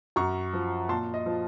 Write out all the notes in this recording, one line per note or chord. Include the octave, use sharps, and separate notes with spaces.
F#2 A#5 C#6
F3
A#2 A5 C6
D#5
F3